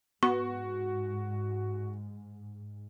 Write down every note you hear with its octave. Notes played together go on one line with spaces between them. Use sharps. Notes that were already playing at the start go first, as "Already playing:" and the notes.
G#2 B3 F#4 C#6